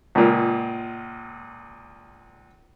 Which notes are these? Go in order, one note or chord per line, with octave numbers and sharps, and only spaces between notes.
C#2 A#2